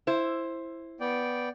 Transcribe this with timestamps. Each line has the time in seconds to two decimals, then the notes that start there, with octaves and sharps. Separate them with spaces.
0.07 E4 C5
1.00 B3 D5 G5